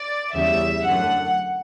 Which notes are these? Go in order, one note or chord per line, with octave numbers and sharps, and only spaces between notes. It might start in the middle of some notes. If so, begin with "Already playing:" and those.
Already playing: D5
E2 C#3 G3 E5
F#2 D3 F#3 A3 F#5